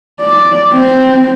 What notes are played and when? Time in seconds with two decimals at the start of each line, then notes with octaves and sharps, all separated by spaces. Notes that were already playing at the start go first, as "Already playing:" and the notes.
0.21 D5
0.73 C4